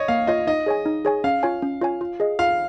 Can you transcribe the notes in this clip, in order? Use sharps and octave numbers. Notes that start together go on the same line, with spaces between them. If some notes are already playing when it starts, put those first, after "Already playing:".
Already playing: C#5 D#5
A#3 F5
F4 C#5 D#5 F5
D#4 D#5
G#4 C#5 G#5
D#4
G#4 C#5 G#5
C#4 F5
F4 C#5 G#5
C#4
F4 C#5 G#5
F4
G#4 D#5
F4 F5